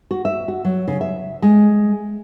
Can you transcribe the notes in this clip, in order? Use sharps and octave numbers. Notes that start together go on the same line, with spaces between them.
F#4
E5
F#4
F#3
C#3
E5
G#3